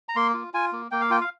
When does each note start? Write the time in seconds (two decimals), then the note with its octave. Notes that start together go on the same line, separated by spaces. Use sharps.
0.09 A#5
0.16 A#3 C6
0.34 F4
0.54 F4 G#5
0.72 A#3
0.91 A#3 G5
1.01 F5
1.10 F4 G5
1.21 F5